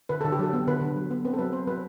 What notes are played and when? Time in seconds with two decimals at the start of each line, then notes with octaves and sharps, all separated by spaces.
0.09 D3 B4
0.21 D3 A4
0.32 G4
0.39 F#3 A4
0.53 B3
0.68 D3 B4
0.81 D3
0.96 F#3
1.11 B3
1.25 C4 B4
1.34 A4
1.38 F#3 B4
1.53 C4 C5
1.67 F#3 B4